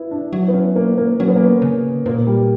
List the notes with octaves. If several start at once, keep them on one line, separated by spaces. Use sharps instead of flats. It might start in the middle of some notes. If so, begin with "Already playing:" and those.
Already playing: B3 E4
D4
F#3 E4
B3
C#4
A#3
A#3
F#3 C#4
B3
A#3
B3
C#3
A#2 A#3
G3